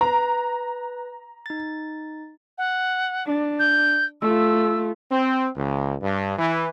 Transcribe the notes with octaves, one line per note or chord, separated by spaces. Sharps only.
B4 A#5
D#4 A6
F#5
D4
G6
A3 F4 E6
C4
C#2
G2
E3